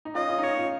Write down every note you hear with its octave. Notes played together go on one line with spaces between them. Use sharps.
D#4
C#4 F4 D#5
C#4 F4
D#4
C#4 C#5
C#4 F4